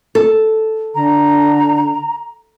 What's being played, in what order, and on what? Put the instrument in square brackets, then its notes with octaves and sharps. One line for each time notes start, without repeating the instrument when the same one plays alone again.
[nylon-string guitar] A4
[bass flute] D3 [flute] A#5